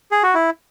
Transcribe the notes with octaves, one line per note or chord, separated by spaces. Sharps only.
G#4
F#4
E4